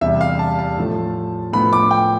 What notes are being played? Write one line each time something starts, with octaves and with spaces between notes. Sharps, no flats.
E2 C3 G3 E5
F5
A5
A5
A2 F3 A3
A2 F3 B3 B5
D6
G5